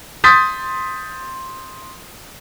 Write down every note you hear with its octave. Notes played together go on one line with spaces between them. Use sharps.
C6 D#6 G6 A6 B6